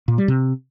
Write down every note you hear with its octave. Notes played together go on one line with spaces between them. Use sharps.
A#2
G3
C3